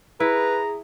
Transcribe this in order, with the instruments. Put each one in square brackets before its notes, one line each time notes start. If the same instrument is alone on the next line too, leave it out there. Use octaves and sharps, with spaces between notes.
[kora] E4 [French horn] G#4 [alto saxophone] B4 [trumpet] A#5